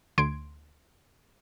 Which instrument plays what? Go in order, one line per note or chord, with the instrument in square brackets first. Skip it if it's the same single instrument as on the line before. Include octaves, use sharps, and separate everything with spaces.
[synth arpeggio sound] D2 C6 G#6 D7